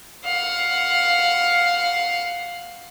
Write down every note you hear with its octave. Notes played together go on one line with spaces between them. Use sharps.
F5 F#5